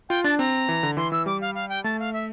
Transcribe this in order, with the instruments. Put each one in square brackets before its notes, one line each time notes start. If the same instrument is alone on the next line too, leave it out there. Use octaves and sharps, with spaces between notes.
[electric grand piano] F4 [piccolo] G5
[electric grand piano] D4 [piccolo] A5
[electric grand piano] C4 [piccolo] A#5
[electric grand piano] E3
D3
[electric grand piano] E3 [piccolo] C6
[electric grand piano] E3 [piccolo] E6
[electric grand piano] G3 [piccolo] D6
[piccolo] F5
F5
G5
[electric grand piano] A3 [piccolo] A5
[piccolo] F5
E5